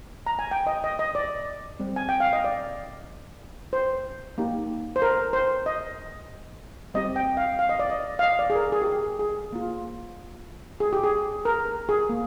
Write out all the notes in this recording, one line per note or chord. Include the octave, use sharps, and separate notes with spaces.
A#5
G#5
G5
D#5
D#5
D#5
D5
G3 C4 G4
G#5
G5
F5
D#5
D5
C5
A#3 D#4 G4
C5
A#4
C5
D#5
G3 C4 G4 D#5
G5
F5
F5
D#5
D5
D#5
F5
D#5
D5
G#4
A#4
G#4
G4
G#4
G#4
A#3 F4
G#4
G4
G#4
A#4
G#4
A#3